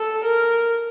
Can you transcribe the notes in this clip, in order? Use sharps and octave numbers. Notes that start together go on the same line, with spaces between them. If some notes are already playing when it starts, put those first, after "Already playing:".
Already playing: A4
A#4